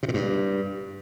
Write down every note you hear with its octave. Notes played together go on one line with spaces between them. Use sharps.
C3
A#2
G2